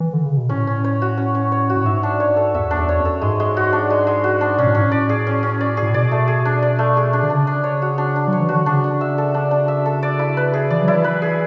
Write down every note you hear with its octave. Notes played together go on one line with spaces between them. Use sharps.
E3
D3
C#3
B2
A2 C#4
C#4
C#5
F#4
C#4
C#4
C#5
F#4
A2
G#2 E5
D4
C#5
A4
E2 E5
D4
E2
C#5
F#2
A4
G#2 G#3
G#3
F#4
D4
G#3
G#3
F#4
D4
B2 C#4
A2
G#2 C#4
A2
D5
G#4
C#4
C#4
D5
G#4
A2
B2 D5
A3
G#4
D4
D5
A3
G#4
D4
D3
C#3 D4
D4
C#5
F#4
D4
D4
F#3 C#5
E3
D3 F#4
C#3 D4
D4
E5
A4
D4
D4
E5
A4
D5
E4
B4
G#4
E3 D5
F#3 E4
E3
B4
G#4